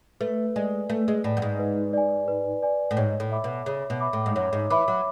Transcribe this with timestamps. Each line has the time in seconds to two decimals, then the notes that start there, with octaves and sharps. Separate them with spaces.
0.21 A3 B4
0.56 G#3 D5 G#5
0.89 A3 B4
1.08 G#3
1.24 A2 D5 G#5
1.37 F#2
1.42 G#2
1.59 B4
1.93 D5 G#5
2.28 B4
2.62 D5 G#5
2.91 A2
2.97 G#2 C#5
3.20 A2
3.31 E5 B5 D6
3.44 B2
3.66 C#3 C#5
3.90 B2
4.01 E5 B5 D6
4.13 A2
4.26 G#2
4.36 F#2 C#5
4.53 G#2
4.70 E3 E5 B5 D6
4.88 F#3